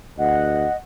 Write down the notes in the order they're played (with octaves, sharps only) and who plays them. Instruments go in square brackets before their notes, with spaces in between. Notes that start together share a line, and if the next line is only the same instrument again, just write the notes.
[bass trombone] D2 [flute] D#5 [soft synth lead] F#5